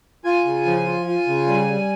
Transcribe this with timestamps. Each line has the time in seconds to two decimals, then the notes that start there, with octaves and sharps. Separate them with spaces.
0.24 F4 G#5
0.45 C#3
0.66 F3
0.86 F4
1.06 F4
1.27 C#3
1.47 G3
1.68 G3